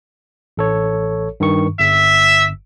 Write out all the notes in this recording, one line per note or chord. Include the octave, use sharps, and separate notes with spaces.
A1 A4 C#5
G2 D#3 C#6
G1 E5